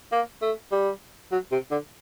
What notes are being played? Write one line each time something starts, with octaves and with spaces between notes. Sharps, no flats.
A#3
A3
G3
F#3
C3
D3